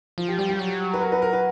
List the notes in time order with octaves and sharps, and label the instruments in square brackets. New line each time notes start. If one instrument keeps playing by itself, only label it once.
[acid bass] F3 [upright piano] F4
[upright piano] G4
[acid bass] G3 [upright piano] G4
[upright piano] G4
[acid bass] F#3
[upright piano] B4
A#4
B4
A#4
B4